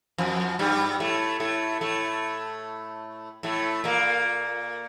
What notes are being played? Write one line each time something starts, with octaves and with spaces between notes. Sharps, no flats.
F2 F3
G2 G3
A2 A3
A2 A3
A2 A3
A2 A3
A#2 A#3